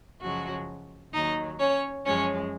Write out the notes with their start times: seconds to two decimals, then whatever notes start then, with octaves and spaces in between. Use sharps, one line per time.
0.21 F#2 C#3 F3 F#3 G#3 F#4
1.13 D#2 D#3 F#3 D#4 D#5
1.59 C#4 C#5
2.05 F#2 F3 G#3 C#4 C#5